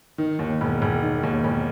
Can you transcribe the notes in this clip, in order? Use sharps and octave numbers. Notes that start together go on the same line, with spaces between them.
D#3
D#2
E1
E1
D#3
D#2
E1